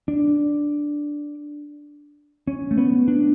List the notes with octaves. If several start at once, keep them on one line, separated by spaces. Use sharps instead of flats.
D4
C#4
A3
B3
D4